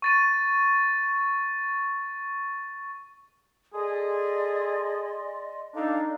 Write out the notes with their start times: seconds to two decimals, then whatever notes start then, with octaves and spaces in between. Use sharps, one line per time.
0.02 C#6 A6 D#7
3.74 G#4 A4 D5 D#5 C6
5.74 D4 D#4 A4 F5